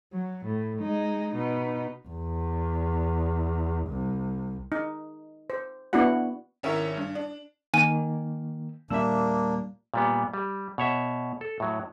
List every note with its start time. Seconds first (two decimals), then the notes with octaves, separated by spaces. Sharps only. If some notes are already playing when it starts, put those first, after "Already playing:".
0.13 F#3
0.46 A2
0.81 G#3 D#4
1.34 B2 D#4
2.08 E2
3.87 C2
4.72 D#4
5.50 C5
5.93 B3 D4 E4 F#4 F#5
6.63 G#1 C#4 E4 A#4 C#5 E5
6.97 G2
7.15 D4
7.74 D#3 A#3 G#5 D#7
8.90 A#2 G3 A#3 D4 E5 E6
9.94 A#2 G3 B3
10.34 G3
10.78 B2 C#5 E5
11.41 A4
11.60 A2 F#3